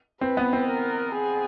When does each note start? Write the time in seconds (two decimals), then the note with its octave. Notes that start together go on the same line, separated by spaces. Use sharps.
0.21 C4 B4
0.37 B3
0.53 C4
0.68 A#4
1.14 G#4